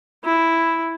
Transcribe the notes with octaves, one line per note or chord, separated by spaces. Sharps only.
E4